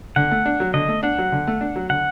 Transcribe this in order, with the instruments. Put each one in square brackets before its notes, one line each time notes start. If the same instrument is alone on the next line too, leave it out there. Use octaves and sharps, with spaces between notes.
[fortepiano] D3 [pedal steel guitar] F#5
[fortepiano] A3
D4
F#3
[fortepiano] D3 [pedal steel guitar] D#5
[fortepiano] A3
[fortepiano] D4 [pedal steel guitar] F#5
[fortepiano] F#3
D3
A3
D4
F#3
[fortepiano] D3 [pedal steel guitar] F#5